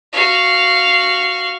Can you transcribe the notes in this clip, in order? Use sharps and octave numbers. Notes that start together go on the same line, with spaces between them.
F#4 F5